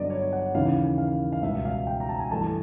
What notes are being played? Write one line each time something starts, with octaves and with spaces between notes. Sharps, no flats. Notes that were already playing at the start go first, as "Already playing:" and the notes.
Already playing: G2 D3 F#3 B3 D4 D5 D#5
C#5
F#5
D#2 C#3 E3 F5
F5
F5
C#2 B2 G3 E5
F5
G5
A#5
A5
G#5
G2 E3 A3 D4 A5